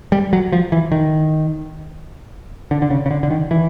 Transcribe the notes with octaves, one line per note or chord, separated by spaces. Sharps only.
G3
F#3
F3
E3
D#3
D3
D3
C#3
C#3
D3
D3
D#3
E3